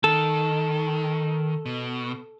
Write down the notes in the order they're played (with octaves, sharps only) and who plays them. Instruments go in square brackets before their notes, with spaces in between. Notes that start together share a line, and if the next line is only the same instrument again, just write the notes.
[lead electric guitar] D#3 [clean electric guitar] A4
[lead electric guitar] B2